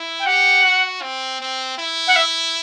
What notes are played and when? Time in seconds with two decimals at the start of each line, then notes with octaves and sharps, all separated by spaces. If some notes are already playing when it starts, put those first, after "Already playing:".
Already playing: E4
0.20 G5
0.26 G4 F#5
0.64 F#4
1.02 C4
1.41 C4
1.78 E4
2.07 F#5
2.16 E5